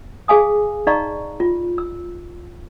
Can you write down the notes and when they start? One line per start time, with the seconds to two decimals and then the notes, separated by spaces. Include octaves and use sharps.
0.28 G#4 F5 G#5 D#6
0.87 D#4 D5 D#5 F5 A#5 C#6
1.40 F4
1.78 E6